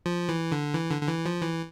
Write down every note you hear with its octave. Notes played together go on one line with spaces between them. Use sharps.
F3
E3
D3
E3
D3
D3
E3
F3
E3